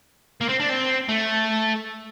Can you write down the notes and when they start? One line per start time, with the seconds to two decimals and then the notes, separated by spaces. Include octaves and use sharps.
0.41 A#3
0.49 C4
0.60 D4
0.69 C4
1.09 A3